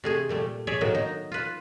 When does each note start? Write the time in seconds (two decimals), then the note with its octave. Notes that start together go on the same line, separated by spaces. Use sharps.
0.04 C3 A3 G#4
0.29 A#2 G3 A3
0.67 G#4 C#5 D5 E5
0.81 A2 D#3 F#3 A#3 B3
0.95 D#4
1.32 F4 B4